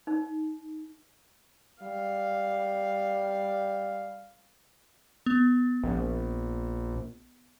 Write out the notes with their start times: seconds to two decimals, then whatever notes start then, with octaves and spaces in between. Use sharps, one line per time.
0.07 D#4
1.83 G3 F5
5.26 B3
5.84 A#1